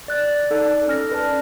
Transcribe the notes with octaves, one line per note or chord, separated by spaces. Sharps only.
D5 F#6 A6
D#4 A4 D5
C#4 F6 A#6
A4 B4 D5 A5